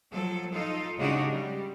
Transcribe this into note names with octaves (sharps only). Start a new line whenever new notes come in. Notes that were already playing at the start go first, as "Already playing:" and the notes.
F3 F#3 A4
D#4 F4 A4
C#3 G#3 D4 D#4 F#4 G4
G3